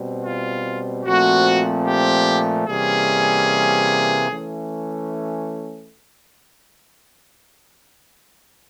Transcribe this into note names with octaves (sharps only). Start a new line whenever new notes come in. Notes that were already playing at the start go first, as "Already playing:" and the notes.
Already playing: B2 G3 C4
F4
A#2 F3 A3 C4 F#4
G4
C3 E3 G3 A#3 C#4 G#4
E3 A3 C#4